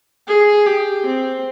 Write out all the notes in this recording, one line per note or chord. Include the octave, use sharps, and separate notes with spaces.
G#4
G4
C4